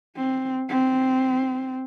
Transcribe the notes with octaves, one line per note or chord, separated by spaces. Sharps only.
C4
C4